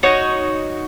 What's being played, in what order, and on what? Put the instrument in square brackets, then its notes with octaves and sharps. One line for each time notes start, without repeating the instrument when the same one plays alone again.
[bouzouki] D#4 F#4 C#5